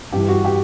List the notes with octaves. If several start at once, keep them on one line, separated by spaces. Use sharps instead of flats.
G2 E3 G4
F#4
G4